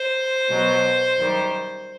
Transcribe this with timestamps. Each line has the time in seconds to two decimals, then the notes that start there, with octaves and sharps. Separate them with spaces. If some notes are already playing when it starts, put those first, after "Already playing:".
Already playing: C5
0.49 B2 F#3 B3
1.17 F#2 D#3 G3